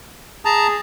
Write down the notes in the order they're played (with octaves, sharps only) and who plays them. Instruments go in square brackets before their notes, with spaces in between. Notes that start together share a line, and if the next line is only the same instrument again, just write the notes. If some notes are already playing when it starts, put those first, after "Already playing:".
[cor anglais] G#4 [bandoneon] A5 A#5